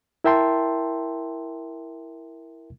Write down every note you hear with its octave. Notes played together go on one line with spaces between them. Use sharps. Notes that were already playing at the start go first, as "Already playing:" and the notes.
E4 A#4 E5 G5 A5 C6